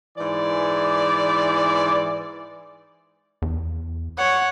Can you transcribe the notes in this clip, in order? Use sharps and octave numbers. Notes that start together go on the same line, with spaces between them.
G#2 E3 D5
E2
C#5 F#5